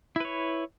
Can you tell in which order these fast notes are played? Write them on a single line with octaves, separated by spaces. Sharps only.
E4 B4 C#5